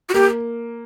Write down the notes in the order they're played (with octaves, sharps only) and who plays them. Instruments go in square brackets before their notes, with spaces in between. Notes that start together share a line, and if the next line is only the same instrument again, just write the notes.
[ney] F#4
[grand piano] A#3 [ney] G4